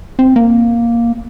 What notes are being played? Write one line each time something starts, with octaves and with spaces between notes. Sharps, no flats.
C4
A#3